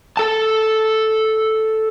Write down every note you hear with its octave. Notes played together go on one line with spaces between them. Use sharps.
A4 A5